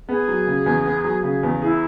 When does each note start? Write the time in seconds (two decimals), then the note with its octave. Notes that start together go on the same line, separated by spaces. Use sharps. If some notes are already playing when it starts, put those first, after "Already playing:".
0.08 B3 G#4
0.28 F#3
0.47 C#3
0.66 E2
0.85 B3
1.04 F#3
1.23 C#3
1.43 E2
1.62 E4 G#4